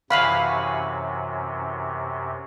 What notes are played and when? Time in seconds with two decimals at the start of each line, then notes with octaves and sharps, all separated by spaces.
0.10 F#2 C3 E3 C#4 F#4 F5 B5